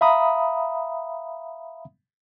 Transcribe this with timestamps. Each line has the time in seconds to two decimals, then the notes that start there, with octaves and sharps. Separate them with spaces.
0.01 E5 F5 A#5 B5 D#6